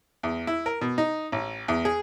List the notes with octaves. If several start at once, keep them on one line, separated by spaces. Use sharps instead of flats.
E2
E4
A#4
B2
D#4
A1
E2
G#4